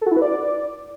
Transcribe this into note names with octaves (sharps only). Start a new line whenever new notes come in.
A4
F#4
E4
B4
D5